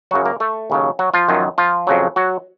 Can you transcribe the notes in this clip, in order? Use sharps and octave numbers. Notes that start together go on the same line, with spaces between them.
F#2 C#3 F#3 F#4
A#3 A#4
A3 A4
D#2 C#3 F#3
F#3 F#4
F3 F4
F#2 D#3 F#3
F3 F4
F2 C#3 F#3
F#3 F#4